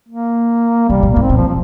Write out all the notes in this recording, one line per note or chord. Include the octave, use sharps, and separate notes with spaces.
A#3
C3 G3
A#2
G#2 A#3
C4
A#2
F3
F3